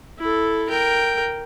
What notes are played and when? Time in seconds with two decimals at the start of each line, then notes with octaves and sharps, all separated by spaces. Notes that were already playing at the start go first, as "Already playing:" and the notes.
0.19 E4 A4
0.69 A#4 G5